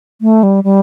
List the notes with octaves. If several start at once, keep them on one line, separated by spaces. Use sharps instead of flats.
A3
G3
G3